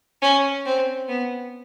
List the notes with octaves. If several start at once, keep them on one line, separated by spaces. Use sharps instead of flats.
C#4
C4
B3